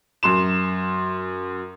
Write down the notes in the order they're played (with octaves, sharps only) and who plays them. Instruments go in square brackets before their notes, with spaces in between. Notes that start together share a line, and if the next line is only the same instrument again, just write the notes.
[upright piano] F#2 C6 E7